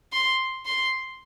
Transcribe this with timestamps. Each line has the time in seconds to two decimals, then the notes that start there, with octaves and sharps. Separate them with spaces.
0.12 C6
0.66 C6